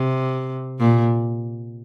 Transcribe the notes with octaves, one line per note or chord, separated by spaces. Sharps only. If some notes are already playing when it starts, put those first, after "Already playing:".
Already playing: C3
A#2